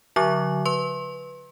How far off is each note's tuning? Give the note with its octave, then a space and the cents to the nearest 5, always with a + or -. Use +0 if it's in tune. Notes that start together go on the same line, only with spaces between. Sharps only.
D3 -35 F#3 -35 C#6 +10
B4 +0 C6 +35